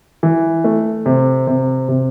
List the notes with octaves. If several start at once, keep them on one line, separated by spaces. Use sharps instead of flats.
E3
A3
C3
C3
C3